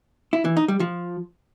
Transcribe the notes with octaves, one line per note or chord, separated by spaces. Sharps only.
E4
E3
D#4
G3
F3